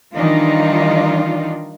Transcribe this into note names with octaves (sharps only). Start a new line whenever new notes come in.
D#3 E3 G3 D4 D#4 F4